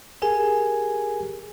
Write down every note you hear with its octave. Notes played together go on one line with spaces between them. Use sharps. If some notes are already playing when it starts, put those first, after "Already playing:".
G4 G#4 A#4 G#5